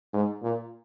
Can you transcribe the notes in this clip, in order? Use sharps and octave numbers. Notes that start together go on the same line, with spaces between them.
G#2
A#2